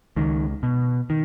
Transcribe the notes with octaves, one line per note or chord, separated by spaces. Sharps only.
C#2 D#3
B2
D#3